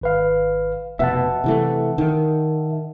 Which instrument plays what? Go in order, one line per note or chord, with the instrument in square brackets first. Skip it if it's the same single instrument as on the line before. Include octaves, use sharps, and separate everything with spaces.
[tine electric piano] G#1 B4 F5
[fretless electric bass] F1 B2 [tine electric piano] E5 F#5 A5
[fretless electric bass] C3 E3 A3
D#3